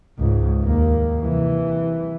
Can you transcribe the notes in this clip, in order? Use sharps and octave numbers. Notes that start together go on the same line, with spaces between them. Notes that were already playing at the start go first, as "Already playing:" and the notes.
C#2 G#2
D#2 A#3
C3 E3